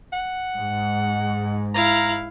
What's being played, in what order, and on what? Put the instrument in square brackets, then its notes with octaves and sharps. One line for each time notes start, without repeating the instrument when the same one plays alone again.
[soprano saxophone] F#5
[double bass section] G#2
[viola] E4 F5 [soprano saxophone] A#5